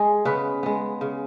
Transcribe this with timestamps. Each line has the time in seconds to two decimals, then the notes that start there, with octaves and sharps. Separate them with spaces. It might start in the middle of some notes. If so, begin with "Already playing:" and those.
Already playing: G#3 G#4
0.25 C#3 B3 B4
0.63 G#3 B3
1.01 C#3